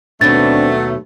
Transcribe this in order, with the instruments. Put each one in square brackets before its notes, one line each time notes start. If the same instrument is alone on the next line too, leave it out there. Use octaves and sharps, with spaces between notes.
[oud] D#2 B2 [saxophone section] F#3 A3 [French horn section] C4 D4 [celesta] A6